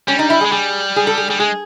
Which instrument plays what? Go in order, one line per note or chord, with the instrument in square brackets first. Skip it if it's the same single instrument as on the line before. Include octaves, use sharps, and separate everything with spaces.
[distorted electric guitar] G3 [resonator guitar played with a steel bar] C#4
[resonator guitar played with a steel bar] D#4
E4
G#4
[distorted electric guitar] G#3
[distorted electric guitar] G3 [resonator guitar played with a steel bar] G#4
[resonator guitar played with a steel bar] G#4
A4
G#4
[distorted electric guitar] G3 [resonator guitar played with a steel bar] G#4
[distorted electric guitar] G#3 [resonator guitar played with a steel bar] G#4